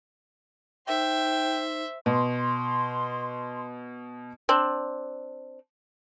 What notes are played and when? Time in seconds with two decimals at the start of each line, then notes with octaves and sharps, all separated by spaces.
0.88 D#4 C5 E5 G5
2.06 B2 C6
4.49 C4 D4